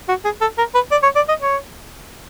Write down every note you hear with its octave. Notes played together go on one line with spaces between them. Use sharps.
F#4
G#4
A4
A#4
B4
D5
C#5
D5
D#5
C#5